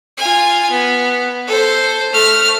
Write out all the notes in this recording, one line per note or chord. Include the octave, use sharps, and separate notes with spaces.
F4 G#5
B3
A4 C5
A3 F6